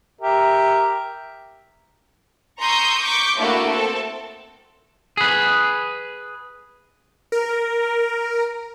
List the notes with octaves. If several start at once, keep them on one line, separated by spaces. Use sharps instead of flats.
G4 A#4 E5
A#5 C6 C#6 D#6 E6 G6
C#6 D6 G6 B6
A3 A#3 D4 E4 F#4 F#5
C4 A4
G#4 B4
A#4